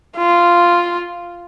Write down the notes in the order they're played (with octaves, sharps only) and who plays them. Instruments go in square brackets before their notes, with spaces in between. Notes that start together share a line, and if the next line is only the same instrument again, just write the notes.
[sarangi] F4